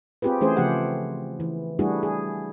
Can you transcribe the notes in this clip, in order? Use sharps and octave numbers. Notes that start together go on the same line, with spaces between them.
C4 F4 G4 G#4 B4
E3 A3 C#4 G#4 C5
C#3 F3 A3 G4 F#5
E3
G3 A3 D4 E4 F#4 G#4
G#4